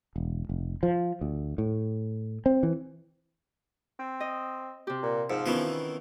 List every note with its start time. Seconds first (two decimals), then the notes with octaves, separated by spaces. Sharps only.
0.16 E1
0.49 F1
0.83 F3
1.21 D2
1.58 A2
2.46 C4
2.63 E3
3.99 C4
4.20 D#5
4.87 C3 G4
5.03 A#2
5.30 G#2 F3 E6 F6
5.46 D#3 E3 B3 C#4 E4 F4